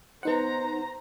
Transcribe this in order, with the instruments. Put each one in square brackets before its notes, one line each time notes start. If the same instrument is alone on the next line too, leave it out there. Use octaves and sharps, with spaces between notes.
[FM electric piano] B3 D#4 F#5 [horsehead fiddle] C5 A#5